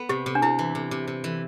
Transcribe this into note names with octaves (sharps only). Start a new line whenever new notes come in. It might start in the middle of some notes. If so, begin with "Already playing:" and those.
Already playing: B3
C3 G4
C3
D4
C3 E4
E3
C3
C3
C3
E3